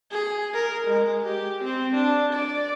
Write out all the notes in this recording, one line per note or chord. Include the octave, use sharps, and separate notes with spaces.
G#4
A#4
G#3
G4
C4
D4
D5